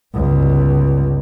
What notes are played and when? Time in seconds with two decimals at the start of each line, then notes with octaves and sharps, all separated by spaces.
0.14 G1 C#2